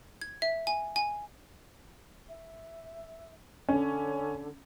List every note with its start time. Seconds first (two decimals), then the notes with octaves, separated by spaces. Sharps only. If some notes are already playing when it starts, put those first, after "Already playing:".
0.21 G#6
0.42 E5
0.67 G#5
0.96 G#5
2.28 E5
3.69 D3 C#4